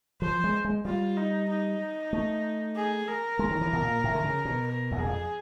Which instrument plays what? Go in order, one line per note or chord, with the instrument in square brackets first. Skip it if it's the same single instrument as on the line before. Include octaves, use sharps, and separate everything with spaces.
[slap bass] F3 [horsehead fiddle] C5
[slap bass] G#3
G#3
[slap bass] G3 [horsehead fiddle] F4
[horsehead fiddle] D#4
D#4
[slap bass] A3
[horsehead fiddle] G#4
A#4
[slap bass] G#3
D#3
E3
B2
A#2
A2
D3
C#3
B2
[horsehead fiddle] A#4
[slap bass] E2
[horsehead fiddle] G#4
[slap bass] F2